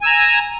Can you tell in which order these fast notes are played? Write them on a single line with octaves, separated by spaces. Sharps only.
G#5 E6 A#5